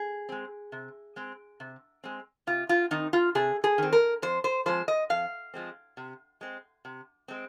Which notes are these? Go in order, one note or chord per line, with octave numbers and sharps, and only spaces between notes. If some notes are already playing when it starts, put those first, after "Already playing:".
Already playing: G#4
G#3 C4
C3
G#3 C4
C3
G#3 C4
C3 F4
F4
D#3 C4 D#4
F4
C3 G#4
G#4
D#3 C4
A#4
F2 C5
C5
F3 G#3 C4 C5
D#5
F2 F5
F3 G#3 C4
C3
G#3 C4
C3
G#3 C4